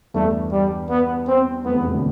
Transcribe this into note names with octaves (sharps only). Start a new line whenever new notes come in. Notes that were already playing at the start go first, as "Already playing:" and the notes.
E2 G2 A3
G3
B3
C4
F2 B3
E2
A2 C3
B2 D3